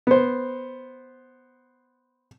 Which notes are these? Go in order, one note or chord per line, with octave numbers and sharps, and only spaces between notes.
B3 C5